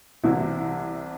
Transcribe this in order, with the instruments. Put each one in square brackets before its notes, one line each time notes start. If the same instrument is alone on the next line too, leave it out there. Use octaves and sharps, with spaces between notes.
[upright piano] C2 C3 E3 E4